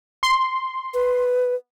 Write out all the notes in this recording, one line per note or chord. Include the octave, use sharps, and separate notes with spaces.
C6
B4